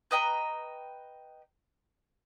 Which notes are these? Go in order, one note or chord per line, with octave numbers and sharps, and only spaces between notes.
B4 D#5 G5 A#5